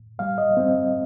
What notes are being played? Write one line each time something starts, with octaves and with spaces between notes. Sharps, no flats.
G2 G3 F5
D#5
G2 G3 C4